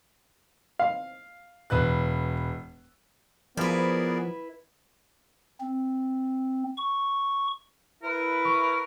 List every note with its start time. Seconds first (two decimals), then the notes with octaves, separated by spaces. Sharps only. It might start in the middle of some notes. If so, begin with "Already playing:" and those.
0.79 F5
1.70 E1 B4 F#6
3.57 F3 B3 E4 G#4 A#4 B4 D5
5.60 C4
6.77 C#6
8.03 E4 A#4 B4
8.45 C#6